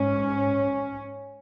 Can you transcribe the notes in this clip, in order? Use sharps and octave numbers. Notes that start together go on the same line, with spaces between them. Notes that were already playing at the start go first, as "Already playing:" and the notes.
Already playing: G#2 C#4